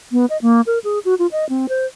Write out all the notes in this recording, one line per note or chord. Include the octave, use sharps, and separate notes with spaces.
B3
D#5
A#3
A#4
G#4
F#4
F4
D#5
C4
C5